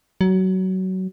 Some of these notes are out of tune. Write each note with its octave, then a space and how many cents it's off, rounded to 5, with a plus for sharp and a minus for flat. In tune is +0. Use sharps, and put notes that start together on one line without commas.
F#3 +20